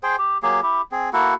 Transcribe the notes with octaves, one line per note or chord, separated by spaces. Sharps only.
G#4 C5 G5
G4
F#3 A#3 G4 G#4
E4 G4
C4 G#4
A#3 E4 F#4 A4